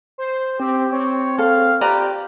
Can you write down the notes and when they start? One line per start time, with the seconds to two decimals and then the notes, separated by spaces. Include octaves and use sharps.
0.18 C5
0.60 C4 G4
0.92 C4 C#5
1.38 A4 F5
1.81 F4 G4 B4 D5 A#5